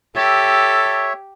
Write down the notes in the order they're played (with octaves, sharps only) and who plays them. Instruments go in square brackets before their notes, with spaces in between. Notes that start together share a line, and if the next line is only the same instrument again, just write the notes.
[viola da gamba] G4 [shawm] A4 [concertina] C#5 E5